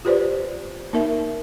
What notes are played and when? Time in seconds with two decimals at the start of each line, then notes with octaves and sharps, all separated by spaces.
0.05 F4 G4 B4 C5 D5
0.93 A#3 D#4 A#4 E5